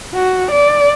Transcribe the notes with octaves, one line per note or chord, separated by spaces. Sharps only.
F#4
D5